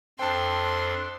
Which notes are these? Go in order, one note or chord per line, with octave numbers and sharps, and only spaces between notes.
F2 D4 A4 C5 G5 A5 C6